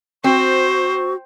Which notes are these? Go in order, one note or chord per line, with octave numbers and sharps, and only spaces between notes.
C4 F#4 C5 C#6